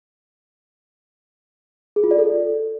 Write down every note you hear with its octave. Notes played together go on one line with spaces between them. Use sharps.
G#4
F4
D5
A4